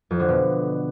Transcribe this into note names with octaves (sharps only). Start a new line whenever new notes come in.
F2
D3
B2